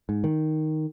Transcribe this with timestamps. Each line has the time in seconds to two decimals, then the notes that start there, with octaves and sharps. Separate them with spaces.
0.09 G#2
0.24 D#3